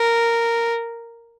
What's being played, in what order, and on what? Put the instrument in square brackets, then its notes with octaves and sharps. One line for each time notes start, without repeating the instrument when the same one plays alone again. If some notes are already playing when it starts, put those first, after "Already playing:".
Already playing: [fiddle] A#4